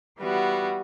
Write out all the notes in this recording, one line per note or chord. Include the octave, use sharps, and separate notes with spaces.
E3 G3 B3 F#4